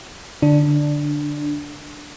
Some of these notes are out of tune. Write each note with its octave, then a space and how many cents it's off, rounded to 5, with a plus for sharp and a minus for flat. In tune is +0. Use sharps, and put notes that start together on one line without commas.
D3 +0 D4 +5